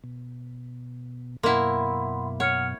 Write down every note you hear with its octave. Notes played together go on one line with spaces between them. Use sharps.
B2
F#2 B2 A#3 E4 F#5 B5 C6
C#5 F#5 F6 C#7